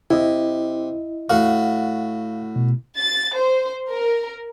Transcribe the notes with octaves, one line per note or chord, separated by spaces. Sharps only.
C3 E4 D#5
A2 F#4 F5 F#5
B2
A6
C5
A#4